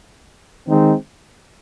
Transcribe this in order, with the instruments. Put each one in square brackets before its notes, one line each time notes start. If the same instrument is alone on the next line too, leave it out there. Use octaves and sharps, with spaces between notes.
[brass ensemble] D#3 G#3 C4 D#4